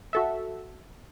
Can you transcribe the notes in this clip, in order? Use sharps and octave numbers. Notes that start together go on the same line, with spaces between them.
F#4 A4 E5